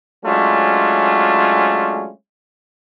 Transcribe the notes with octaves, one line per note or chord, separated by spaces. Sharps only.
F#3 G#3 A3 C#4 D4 F4